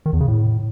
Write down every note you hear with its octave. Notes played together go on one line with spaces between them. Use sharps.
D#3
E2
C#3
A2